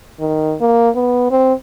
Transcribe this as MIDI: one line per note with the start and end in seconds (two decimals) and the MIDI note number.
0.20 0.55 51
0.61 0.90 58
0.96 1.29 59
1.31 1.54 60